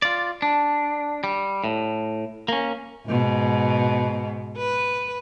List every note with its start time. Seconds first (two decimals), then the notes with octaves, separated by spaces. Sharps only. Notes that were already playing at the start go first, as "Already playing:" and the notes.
0.02 F4 D5
0.42 D4
1.24 G3
1.64 A2
2.48 A#3 C#4
3.08 G#2 B2
4.57 B4